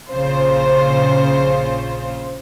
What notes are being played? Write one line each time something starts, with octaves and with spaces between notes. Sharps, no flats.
A#1 C#3 F4 C5